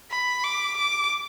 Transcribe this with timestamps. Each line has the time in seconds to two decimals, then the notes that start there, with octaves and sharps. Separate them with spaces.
0.10 B5
0.44 D6
0.77 D6